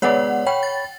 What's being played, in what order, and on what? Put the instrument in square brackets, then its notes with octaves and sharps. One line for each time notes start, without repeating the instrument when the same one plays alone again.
[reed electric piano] G#3 B3 D5 [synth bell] C#5 F#5
[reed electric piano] C#5 B5 [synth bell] G5
[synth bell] A6